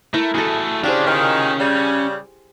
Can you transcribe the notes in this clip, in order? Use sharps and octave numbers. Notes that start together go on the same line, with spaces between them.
A3 E4 A#4
A3 F#4 G#4 A4
C#4 D4 G4 G#4 C5 F5
A#2 D#3
C#3 G3